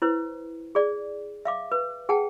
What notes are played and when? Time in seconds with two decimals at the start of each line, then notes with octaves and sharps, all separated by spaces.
0.02 E4 B4 C5
0.75 G#4 D5
1.45 E5 F5 D6
1.72 B4
2.09 G#4 F#5 G5 A5